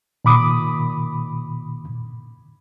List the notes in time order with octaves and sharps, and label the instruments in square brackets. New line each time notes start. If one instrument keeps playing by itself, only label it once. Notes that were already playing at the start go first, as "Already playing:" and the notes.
[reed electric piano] A#2 D#3 B5 D6 D#6